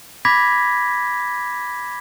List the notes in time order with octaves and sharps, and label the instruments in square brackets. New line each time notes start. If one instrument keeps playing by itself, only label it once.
[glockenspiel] B5 D6 G#6 A#6 B6